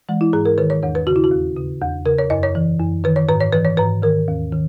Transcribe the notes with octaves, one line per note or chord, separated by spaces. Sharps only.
E3 G#3
E4
G#2 G#4
A#4
D#3 B4
C#5
E2 C#5
B4
C#3 F#4
E4
F#4
D#2
C#3
E2
C#3 A#4
C#5
F#2 D#5
C#5
E3
F#2
D#3 B4
C#5
G#2 B4
C#5
E3 B4
C#5
G#2 B4
D#3 A#4
D#2
D#3